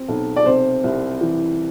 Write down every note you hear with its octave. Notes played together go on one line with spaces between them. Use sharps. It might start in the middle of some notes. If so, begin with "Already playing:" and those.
Already playing: C4
B1
D5
C3 C5
C2
E3